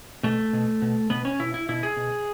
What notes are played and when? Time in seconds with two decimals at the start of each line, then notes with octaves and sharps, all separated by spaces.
0.23 B2 A3
0.53 B2
0.82 B2
1.10 B2 B3
1.25 C#4
1.39 B2 E4
1.54 E4
1.69 B2 E4
1.83 G#4
1.97 B2